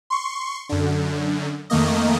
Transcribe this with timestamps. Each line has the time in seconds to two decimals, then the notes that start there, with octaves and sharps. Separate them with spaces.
0.10 C6 C#6
0.69 F#2 D3
1.70 F2 D#3 A3 A#3 D#5